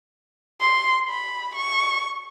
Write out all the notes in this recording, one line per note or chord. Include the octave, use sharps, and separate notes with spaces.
C6
B5
C#6